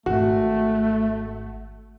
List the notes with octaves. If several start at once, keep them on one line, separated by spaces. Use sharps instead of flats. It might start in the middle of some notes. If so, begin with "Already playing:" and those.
G#1 A3 F#4